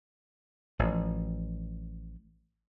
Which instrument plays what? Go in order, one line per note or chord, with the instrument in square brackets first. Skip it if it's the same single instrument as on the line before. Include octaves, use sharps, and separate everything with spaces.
[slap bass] A1 F3